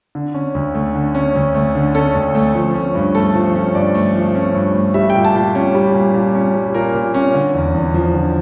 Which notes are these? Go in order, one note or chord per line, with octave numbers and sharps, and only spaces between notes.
D3
C#4
D2
A3
D3
C#4
D2
A3
D3
C#4 A4
D2
A3
F3
C#4
G2
A3 A4
F3
C#4
G2 D5
A3
F3
C#4
G2
A3
G3 E5
G5
A#2
A5
A#2
C#4
G3
A#2
A#2
C#4
G3
A#2 A#4
A#2
C#4
D3
E2
E2
F3
D3